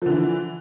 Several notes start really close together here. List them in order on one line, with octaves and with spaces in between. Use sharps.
F3 D3 E3